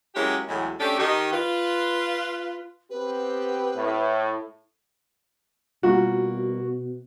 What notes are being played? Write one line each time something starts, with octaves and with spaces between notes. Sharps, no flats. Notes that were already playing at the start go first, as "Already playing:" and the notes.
F#3 G#3 A#3 C#4 E4 G4
E2 A2 F#3 G#3
A3 C#4 D4 G4 A4
D#3 D#4 G4
F4 B4
B3 C4 G4 B4
A2
B2 G3 A#3 F4 F#4